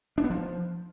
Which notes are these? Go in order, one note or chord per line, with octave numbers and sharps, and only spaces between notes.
D4
B3
F3